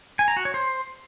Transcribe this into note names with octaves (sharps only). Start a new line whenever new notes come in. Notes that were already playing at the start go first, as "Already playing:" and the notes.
G#5
A#5
F#4
C#5
C5